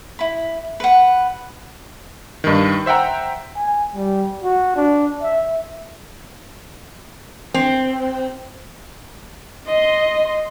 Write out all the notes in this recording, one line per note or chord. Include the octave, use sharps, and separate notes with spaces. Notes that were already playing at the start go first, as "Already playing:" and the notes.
E4 B5
B4 F#5
G2 D#3
C5 E5 F#5 G5 A#5
G#5
G3
F#4
D4
E5
C4
D#5 C6